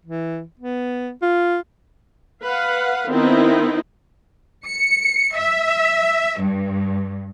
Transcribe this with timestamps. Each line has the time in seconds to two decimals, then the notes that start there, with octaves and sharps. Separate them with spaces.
0.05 E3
0.60 B3
1.22 F4
2.43 B4 F5 F#5
3.08 D#3 B3 C4 D#4 E4
4.66 C#7
5.37 E5
6.40 G2